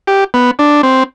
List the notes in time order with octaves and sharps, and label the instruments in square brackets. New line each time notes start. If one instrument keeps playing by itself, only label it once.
[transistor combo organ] G4
B3
D4
C4